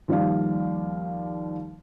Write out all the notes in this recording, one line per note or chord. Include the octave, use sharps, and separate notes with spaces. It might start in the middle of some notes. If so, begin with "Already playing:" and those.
D#2 F3 G3 D5 F5